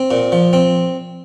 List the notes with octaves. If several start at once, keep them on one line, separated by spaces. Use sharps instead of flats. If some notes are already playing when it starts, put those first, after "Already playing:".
Already playing: C4 C5
A#2
F3
C4